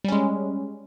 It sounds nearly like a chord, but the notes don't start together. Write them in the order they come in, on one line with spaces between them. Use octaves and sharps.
G3 C#4 G#3